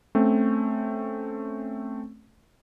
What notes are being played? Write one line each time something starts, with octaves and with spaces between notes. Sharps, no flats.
A3 C4 C#4